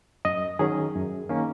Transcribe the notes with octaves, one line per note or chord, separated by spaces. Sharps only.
F#2 D#5
D#3 F#3 C#4 G#4
F#2
D#3 A#3 C#4